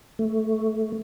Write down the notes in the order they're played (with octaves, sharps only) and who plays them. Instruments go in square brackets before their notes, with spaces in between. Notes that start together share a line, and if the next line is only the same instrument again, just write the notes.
[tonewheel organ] A3